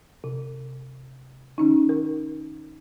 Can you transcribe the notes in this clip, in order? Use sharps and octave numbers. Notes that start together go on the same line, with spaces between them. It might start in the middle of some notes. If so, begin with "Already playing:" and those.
C3
D#3 C#4 D#4
A#4